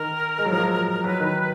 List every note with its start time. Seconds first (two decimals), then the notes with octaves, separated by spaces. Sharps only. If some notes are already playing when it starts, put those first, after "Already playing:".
Already playing: D#3 A#4
0.38 G#3
0.45 F#3
0.52 F3
0.60 F#3
1.04 F#3 B4
1.20 D#3